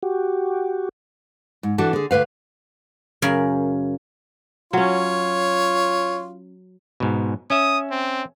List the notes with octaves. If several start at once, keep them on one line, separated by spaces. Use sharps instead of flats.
F#4 G4
G#2
E3 D4 F#4 A4
D3 G#4
D2 E3 B4 F5
F#2 C#3 A#4
F#3 C#4 F4 C#5
G#2 B2
C#4 E5 D#6
C4